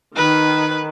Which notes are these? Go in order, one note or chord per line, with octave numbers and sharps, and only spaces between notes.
D#3 B4